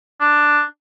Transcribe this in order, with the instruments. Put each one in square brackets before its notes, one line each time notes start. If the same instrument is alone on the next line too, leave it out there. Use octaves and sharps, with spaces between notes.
[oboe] D4